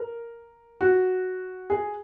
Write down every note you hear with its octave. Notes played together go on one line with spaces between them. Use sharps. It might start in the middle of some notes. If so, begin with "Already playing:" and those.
Already playing: A#4
F#4
G#4